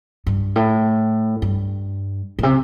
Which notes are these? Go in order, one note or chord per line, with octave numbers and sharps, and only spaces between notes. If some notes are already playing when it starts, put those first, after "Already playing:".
G2
A2
G2
A2
C3